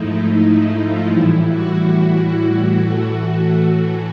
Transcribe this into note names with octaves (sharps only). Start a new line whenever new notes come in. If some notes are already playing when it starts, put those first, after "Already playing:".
Already playing: G#2 F3 A3 D#4 E4
E4
E4
F4
A2 E3 G3 E4
F#4
A2 E3 A3
F#4